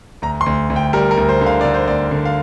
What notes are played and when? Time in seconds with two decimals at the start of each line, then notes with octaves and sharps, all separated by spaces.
0.22 D2 A#5
0.41 C6
0.46 D2
0.70 D2
0.76 G5
0.93 G3 A#4
1.11 A#4
1.17 D2
1.29 C5
1.41 D3
1.46 F5
1.61 D3 D5
1.74 C5
1.88 D2 D5
2.11 D3
2.25 F5